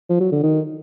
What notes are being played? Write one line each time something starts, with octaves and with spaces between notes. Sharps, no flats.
F3
F#3
D3
D#3